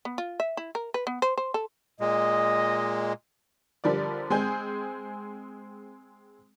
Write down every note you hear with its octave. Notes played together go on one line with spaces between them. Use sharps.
B3
F4
E5
E4
A#4
B4
B3
C5
C5
A4
A#2 G#3 D#5
D3 F3 G3 A#4 D5
G#3 C4 G#4 G6